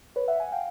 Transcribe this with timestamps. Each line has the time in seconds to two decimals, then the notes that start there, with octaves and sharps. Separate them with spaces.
0.16 B4 C#5
0.28 E5 F#5
0.40 F#5 G#5
0.52 F5 G5